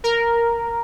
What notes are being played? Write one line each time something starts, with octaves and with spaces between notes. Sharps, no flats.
A#4